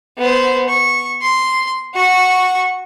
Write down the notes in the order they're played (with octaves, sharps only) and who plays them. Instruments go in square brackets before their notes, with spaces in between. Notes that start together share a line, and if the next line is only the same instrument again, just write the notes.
[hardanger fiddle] B3 C5
C#6
C6
F#4 C#6